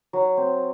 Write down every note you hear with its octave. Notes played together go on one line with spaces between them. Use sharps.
F#3
C4